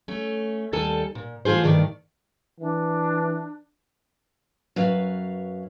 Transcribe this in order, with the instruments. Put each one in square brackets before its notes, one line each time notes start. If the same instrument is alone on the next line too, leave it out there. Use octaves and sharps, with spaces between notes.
[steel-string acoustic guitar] A3 C#4
D#2 G3 A4 G#5 A5
A#2
E3 A3 F4 G#4 C5
G2 A#2 D#3 A3 D5
[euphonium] E3 [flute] D4
[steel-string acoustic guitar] F#2 B4 C#5 F5